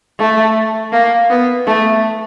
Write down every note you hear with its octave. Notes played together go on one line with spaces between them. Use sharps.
A3
A#3
B3
A3